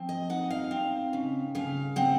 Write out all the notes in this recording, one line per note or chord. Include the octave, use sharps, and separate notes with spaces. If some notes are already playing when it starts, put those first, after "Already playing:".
Already playing: F3 C4
D#5
D#4 F#5
F5
C4
C#3
C#3 F5
C4 F#5